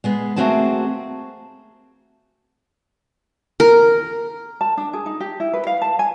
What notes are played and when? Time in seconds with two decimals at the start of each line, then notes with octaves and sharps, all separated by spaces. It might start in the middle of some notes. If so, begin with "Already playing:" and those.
0.04 G#3 B3 G#4
0.36 A3 A#3 C4 F#4 G#4 A5
3.60 A#4
4.61 A5
4.77 D4
4.93 G#4
5.06 D#4
5.20 G4
5.40 E4
5.54 B4
5.67 F5
5.82 A5
5.99 G#5